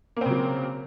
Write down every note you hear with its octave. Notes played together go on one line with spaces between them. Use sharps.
C#3 F#3 A#3 C4